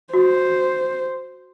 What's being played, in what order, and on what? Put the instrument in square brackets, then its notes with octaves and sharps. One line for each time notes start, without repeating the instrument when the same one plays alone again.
[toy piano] F#4 [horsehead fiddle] C5